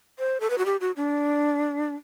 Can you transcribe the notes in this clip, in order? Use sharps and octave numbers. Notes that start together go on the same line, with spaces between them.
C5
A4
B4
F#4
G4
F#4
D4